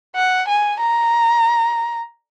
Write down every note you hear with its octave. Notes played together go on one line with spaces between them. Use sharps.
F#5
G#5
A#5